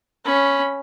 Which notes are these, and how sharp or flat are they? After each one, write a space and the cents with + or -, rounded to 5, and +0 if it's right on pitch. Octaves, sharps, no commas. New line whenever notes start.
C#4 +0 B5 +0